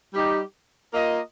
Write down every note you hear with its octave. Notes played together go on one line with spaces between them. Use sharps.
G3 D#4 G4
A#3 F4 A#4 D#5